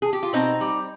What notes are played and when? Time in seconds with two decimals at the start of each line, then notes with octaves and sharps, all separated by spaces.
0.02 G#4
0.13 G4
0.23 F4
0.33 B2 C4 D#4
0.61 G3